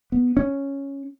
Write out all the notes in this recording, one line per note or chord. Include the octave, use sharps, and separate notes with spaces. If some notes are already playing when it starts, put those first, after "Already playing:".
B3
C#4